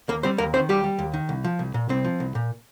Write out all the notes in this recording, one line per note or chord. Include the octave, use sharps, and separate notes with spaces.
D#2 A#3 A#4
G3 C4 C5
D#2 A#3 A#4
D#3 C4 C5
D#2 G3 G4
G3
D#2
D#3
C2
F3
C2
A#2
C2 C4
F3
C2
A#2